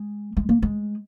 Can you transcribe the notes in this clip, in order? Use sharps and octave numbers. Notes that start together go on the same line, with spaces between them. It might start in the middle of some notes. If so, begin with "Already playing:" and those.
Already playing: G#3
G#3
A#3
G#3